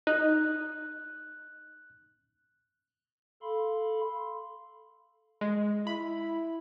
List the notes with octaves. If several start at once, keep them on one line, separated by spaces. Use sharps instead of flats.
D#4 F#6
A4 F5 B5 C6
G#3
E4 B5